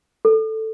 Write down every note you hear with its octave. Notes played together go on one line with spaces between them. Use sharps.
A4